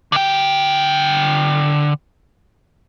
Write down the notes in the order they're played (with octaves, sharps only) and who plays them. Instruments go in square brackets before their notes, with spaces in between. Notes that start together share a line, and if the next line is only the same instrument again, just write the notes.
[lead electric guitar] D3 G5